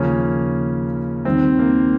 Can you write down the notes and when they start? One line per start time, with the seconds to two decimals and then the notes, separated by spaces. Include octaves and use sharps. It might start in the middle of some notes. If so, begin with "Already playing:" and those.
Already playing: D#2 C#3 F3 A#3 C#4
1.25 D#2 D#3 G3 C4
1.59 A#3